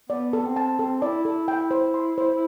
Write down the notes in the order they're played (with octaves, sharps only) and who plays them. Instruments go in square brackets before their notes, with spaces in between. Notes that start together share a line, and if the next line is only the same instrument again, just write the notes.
[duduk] B3 [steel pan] D5
[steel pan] A4
[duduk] C4
[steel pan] A5
[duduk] C4 [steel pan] A4
[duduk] E4 [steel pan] D5
[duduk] E4 [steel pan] A4
[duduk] E4 [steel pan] G5
[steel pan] C5
C6
C5